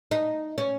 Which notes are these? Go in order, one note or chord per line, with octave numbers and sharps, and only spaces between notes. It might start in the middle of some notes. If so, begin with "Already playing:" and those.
D#4
C#4